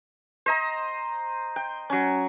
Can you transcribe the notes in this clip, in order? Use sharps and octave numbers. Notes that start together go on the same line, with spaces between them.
C5 D#5 A#5
G5
F#3 C#4